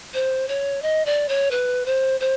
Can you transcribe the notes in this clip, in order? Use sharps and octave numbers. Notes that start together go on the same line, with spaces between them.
C5
C#5
D#5
D5
C#5
B4
C5
C5